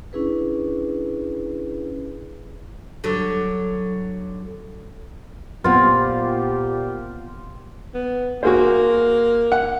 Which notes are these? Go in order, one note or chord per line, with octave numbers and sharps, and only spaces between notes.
C#4 D4 E4 G#4 B4
D3 F#3
A#2 B3 C4 F4 G4
B3
A#3 F#4 G#4 C5
F#5